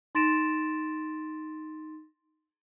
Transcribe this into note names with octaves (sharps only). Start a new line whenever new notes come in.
D#4 C6 A6 A#6 D7 E7